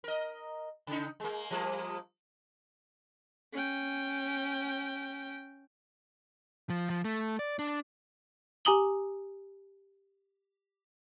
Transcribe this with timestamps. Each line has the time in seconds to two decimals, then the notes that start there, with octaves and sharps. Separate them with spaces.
0.04 A#4 D#5
0.87 C#3 D#4
1.20 G#3 A#3
1.51 F3 G3 A#3
3.53 C#4 G5
6.70 F3
6.90 F3
7.05 A3
7.39 D5
7.59 D4
8.65 G4 G#5 A#5 D#6 F#7 G7